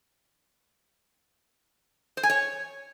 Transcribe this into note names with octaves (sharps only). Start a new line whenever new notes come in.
C5
G#5
C#5